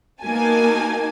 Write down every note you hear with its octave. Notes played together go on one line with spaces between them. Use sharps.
A#3 B3 D#4 F#4 G#5 A5